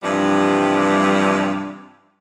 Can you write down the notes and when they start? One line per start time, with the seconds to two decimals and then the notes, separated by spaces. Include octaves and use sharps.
0.03 G2 C3 E3 F3 G3